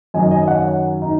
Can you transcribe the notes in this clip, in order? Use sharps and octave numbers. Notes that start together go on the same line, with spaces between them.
F#2 D#3 F#3 D#5 G#5
D#5 G#5
C#5 F#5
D#4